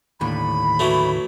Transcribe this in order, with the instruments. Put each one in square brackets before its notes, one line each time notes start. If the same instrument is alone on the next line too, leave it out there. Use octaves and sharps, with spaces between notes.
[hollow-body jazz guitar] D#2 A2 D3 [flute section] B5
[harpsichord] E3 F#3 A3